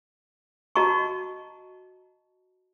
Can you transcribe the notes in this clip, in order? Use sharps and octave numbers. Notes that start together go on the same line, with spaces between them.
F#4 D#5 A5 A#5 C#6